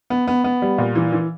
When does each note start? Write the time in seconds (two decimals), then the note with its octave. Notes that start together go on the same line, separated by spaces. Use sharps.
0.10 B3
0.28 B3
0.44 B3
0.62 G3
0.78 A#2
0.95 E3
1.12 E3